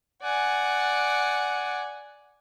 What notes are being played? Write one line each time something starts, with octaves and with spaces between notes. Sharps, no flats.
D5 F#5 G#5